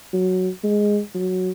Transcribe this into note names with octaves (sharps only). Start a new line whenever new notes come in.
F#3
G#3
F#3